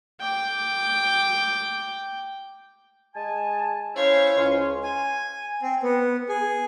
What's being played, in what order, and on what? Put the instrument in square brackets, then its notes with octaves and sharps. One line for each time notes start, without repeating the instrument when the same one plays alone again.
[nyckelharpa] G5 D6
[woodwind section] G#3 G#5 A5
[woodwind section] C#4 E4 C5 [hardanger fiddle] C#5 F5
[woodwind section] C#2 C#4 C6
[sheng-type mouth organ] G#5
C4
B3
G#4